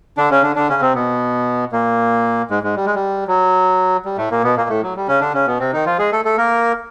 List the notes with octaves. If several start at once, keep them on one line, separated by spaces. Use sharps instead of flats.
D3 D4
C#3 C#4
D3 D4
D3 D4
C#3 C#4
C3 C4
B2 B3
A#2 A#3
G#2 G#3
G#2 G#3
G3
G#3
G3
F#3
G3
A2 A3
A#2 A#3
B2 B3
A#2 A#3
A2 A3
F#3
G3
C#3 C#4
D3 D4
C#3 C#4
B2 B3
C3 C4
D#3 D#4
F3 F4
G#3 G#4
A3 A4
A3 A4
A#3 A#4